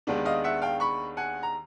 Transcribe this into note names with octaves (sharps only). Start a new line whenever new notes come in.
D#2 D#3 G#3 B3 D4
D#5 F5
E5 F#5
F5 G5
B5 C#6
F#5 G#5
A#5